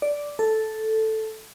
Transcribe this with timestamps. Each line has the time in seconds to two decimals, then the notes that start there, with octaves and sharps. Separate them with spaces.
0.02 D5
0.39 A4